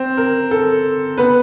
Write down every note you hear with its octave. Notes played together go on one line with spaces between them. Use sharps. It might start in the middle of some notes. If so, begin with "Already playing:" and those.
Already playing: C4
A#4
A4
B3 B4